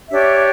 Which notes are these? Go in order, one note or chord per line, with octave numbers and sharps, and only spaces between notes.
D4 G4 C#5 E5